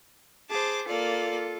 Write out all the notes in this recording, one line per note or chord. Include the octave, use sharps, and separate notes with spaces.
G#4 C5 A5 D6
A#3 F4 A4 D5